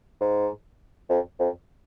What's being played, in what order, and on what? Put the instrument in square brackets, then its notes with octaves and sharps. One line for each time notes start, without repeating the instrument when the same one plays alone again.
[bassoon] G#2
F2
F2